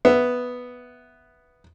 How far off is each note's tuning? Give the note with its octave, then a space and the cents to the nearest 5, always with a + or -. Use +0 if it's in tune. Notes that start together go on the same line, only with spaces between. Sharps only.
B3 +0 E5 +0